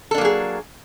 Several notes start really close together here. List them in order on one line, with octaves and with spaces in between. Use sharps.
A4 D4 A#3 F#3 G#4